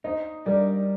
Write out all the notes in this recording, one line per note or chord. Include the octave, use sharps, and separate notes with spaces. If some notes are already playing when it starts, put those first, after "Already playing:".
D#4 C5 D#5
G3 A#4 D5